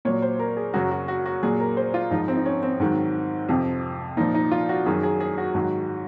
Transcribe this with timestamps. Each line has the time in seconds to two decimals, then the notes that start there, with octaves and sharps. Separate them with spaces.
0.05 A#2 F#3 C#5
0.22 C5
0.39 A#4
0.57 G#4
0.74 F#2 C#3 F#3 F#4
0.91 F#4
1.08 F#4
1.26 F#4
1.43 A#2 F#3 G#4
1.60 A#4
1.77 C5
1.94 F4
2.11 G#2 F3 D#4
2.28 C4
2.37 D#4
2.46 C#4
2.63 C4
2.80 G#2 D#3 F#3
3.49 F2 C3 F3
4.17 A#2 F3 D#4
4.34 D#4
4.51 F4
4.69 F#4
4.86 F#2 D#3 F#3 G#4
5.03 G#4
5.20 G#4
5.38 F#4
5.55 G#2 D#3 F#3